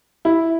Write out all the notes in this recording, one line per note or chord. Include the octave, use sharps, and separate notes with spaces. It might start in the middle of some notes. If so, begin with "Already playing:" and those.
E4